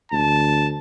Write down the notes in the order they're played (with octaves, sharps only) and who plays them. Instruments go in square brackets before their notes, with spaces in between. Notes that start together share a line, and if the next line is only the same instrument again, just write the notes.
[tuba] D2 [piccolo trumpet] A5